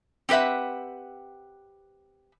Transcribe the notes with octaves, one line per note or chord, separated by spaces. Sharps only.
C4 G4 B4 E5 F#5